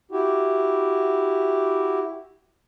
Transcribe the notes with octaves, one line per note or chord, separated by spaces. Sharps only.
E4 F#4 G4